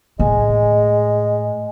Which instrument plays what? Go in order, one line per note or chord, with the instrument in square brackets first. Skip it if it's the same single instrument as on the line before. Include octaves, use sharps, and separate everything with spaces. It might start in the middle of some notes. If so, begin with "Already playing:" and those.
[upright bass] A2 [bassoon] G#3 [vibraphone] G#5